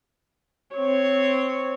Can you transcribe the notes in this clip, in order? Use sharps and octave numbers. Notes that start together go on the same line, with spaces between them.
C4 C#5